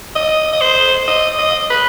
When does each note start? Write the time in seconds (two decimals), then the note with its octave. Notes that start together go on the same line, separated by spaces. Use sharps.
0.15 D#5
0.53 D#5
0.61 C5
1.08 D#5
1.39 D#5
1.70 B4